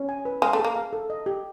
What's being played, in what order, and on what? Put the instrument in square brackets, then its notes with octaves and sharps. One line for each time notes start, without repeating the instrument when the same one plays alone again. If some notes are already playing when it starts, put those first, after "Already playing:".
Already playing: [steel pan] C#4
G#5
B4
[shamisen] G#3 [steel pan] F5
[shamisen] A3
[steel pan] G#4
[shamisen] A#3
[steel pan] F5
A4
D#5
G4